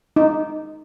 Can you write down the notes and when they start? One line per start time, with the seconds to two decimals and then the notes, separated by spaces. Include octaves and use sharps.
0.16 D#4